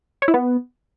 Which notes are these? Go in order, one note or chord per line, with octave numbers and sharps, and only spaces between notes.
C#5
E4
B3